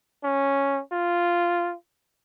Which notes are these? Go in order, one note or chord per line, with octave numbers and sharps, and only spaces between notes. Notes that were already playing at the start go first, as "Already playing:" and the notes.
C#4
F4